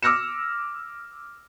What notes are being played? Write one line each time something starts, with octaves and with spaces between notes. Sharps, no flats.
D6 E6 F6 A#6 C#7 E7